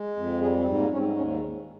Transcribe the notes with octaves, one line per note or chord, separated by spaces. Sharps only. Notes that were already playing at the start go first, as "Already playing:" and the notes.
Already playing: G#3
F2
G3 G#4
C4
G#2
A#3
G#2 C#4
C4
D#2 C#4